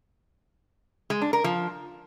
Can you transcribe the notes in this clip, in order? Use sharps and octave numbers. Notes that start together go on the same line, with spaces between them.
G#3
D4
A#4
F3